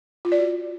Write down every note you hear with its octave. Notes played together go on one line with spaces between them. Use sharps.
F4
D5
F#4